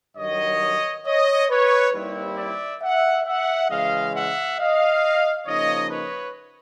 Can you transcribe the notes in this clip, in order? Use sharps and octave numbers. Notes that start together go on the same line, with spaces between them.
G2 D#3 F#3 C#5 D#5
C#5 D#5
B4 C#5
D#2 D#3 G3 C4 E4
D5 E5
E5 F#5
E5 F#5
C#3 E3 G#3 D#5 F5
E5 F#5
D#5 F5
C#3 F3 A#3 D#4 C#5 D#5
B4 C#5